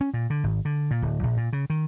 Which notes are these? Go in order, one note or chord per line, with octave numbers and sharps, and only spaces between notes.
C#4
A#2
D3
G#1
D3
A#2
D1
A#1
A#2
C#3
D#3